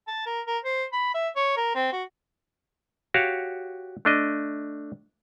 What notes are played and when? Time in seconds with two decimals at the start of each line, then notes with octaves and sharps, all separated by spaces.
0.08 A5
0.26 A#4
0.46 A#4
0.64 C5
0.93 B5
1.14 E5
1.36 C#5
1.57 A#4
1.75 C4
1.92 F#4
3.14 F#4 G4 C#5 F5
4.05 A3 D4 D#5